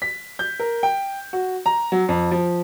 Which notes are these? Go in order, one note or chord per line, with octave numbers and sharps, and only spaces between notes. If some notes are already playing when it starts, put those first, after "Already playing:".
B6
G6
A#4
G5
F#4
A#5
F#3
F2
F3